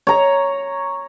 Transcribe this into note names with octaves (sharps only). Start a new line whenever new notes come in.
C#5 A#5